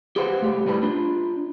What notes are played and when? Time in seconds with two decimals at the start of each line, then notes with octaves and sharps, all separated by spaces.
0.16 G4 G#4 B4 C5 F5 F#5
0.41 C2 A3 G4
0.67 A2 G3 B4 A5 B5
0.83 D4 F4